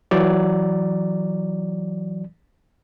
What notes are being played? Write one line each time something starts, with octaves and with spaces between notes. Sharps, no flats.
E3 F#3 D5